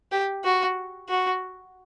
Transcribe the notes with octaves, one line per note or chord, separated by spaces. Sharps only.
G4
F#4
F#4